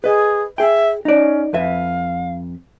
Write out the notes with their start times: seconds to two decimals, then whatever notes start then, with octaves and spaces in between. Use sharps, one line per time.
0.04 G#4 B4 D#5
0.58 G#4 E5 G5
1.05 C#4 D#4 D5
1.53 F2 B4 E5 F5